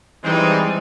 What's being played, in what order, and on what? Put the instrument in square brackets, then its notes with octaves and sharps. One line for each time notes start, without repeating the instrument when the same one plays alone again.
[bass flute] E3 [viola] G3 [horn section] G#3 C4 D#4